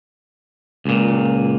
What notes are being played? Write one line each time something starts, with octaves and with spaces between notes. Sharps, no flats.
C#2 A#2